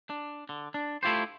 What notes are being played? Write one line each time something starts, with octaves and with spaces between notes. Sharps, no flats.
D4
D3
D4
A3 E4 F4 G4 C5